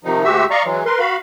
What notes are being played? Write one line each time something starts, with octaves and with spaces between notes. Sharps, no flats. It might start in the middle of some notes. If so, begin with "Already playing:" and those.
C3 D#3 F3 D#4
D2 G#3 F#4 G4 E5 E6
D5 D#5 F5 A#5 C#6
E3 F#3 G#3
A#4 B4 C6
F#4 F5 B5